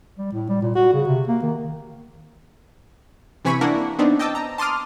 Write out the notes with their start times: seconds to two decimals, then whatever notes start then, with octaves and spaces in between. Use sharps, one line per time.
0.18 G3
0.33 A2
0.49 G3
0.62 A#2
0.75 F#4
0.93 C#3
1.07 C3
1.28 A#3
1.42 D#3
3.45 C3 E3 C4 G#5 B5 C#6
3.61 A#3 D4 E4 A#4 F#5
3.99 B3 C4 D4 D#4
4.19 D#5 G5 A5 D6 E6
4.35 A#5
4.58 A5 C6 D6 D#6 F6